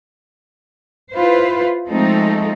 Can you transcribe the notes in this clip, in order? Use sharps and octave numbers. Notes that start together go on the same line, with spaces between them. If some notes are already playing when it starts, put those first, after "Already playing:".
E4 F4 B4 C5
F3 G#3 A3 C4 D#4 A4